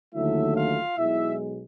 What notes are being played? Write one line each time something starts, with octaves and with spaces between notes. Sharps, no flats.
D#2 D3 F#3 A3 E4 E5
F4 F5
B1 B2 G#3 E4 E5